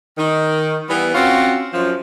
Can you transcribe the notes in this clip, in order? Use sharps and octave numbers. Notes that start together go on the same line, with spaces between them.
D#3
E3 G3 B3
C4 C#4 F4 F#4
F#2 F3